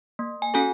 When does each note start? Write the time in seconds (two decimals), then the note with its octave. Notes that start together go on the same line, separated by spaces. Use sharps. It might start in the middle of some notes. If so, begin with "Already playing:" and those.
0.19 A#3
0.42 G#5
0.54 C#4 F#4 A4 G#5